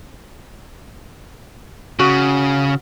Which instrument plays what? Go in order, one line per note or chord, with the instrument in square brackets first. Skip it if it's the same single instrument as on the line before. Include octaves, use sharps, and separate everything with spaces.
[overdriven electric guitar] C#3 [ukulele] F#4